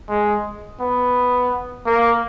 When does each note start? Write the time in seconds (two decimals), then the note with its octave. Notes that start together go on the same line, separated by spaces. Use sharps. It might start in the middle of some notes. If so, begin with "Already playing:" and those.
0.09 G#3
0.80 B3
1.86 A#3